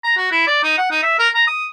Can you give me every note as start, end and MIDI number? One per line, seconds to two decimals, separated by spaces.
0.04 0.14 82
0.17 0.31 66
0.32 0.43 64
0.47 0.59 74
0.63 0.73 63
0.78 0.89 78
0.91 1.01 63
1.03 1.17 76
1.19 1.29 70
1.34 1.44 82
1.47 1.66 87